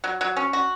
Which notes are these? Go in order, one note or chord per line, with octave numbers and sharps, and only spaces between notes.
F#3
F#3
C#4
F#4